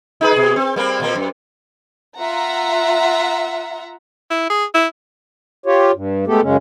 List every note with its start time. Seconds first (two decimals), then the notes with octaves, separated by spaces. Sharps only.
0.21 D#4 G#4 B4
0.32 B2 G#4
0.56 C4
0.76 G3 A#3 C4
1.00 A#2 A#3 C4
1.15 F#2
2.18 F4 E5 F#5 A#5
4.30 E4
4.50 G#4
4.74 E4
5.66 F4 G4 C#5
5.94 G2
6.27 G#3 A3 B3 G4 A4
6.42 F#2 C#3 G#3 C#4